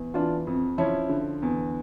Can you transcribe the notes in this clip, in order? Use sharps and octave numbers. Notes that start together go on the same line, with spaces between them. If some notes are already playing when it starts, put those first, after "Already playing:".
Already playing: E2
E3 D4 F4
F2
F3 C#4 E4
D3
E2